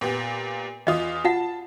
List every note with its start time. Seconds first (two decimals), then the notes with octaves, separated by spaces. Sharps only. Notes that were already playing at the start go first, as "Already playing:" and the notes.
0.01 A#2 B3 G4
0.87 E2 F4 D#5 D#6
1.25 F4 F#5 A5